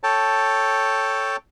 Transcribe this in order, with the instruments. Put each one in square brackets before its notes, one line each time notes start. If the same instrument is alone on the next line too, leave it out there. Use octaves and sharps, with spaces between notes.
[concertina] A4 C#5 G5 A5